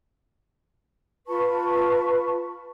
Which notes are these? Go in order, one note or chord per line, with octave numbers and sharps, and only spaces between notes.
F4 B4 A5 C#6